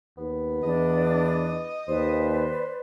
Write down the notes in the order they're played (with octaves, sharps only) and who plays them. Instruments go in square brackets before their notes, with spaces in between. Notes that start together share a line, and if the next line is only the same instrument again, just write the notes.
[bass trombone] D#2 [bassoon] B3
[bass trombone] E2 [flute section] D4 A5 [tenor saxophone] D#5
[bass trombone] D#2 [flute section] B4 D5 [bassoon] C5